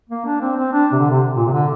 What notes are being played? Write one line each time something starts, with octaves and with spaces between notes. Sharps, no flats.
A#3
D4
C4
C4
D4
C3
D3
C3
A#2
C3
D3